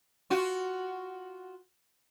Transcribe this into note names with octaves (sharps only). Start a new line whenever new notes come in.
F4 F#4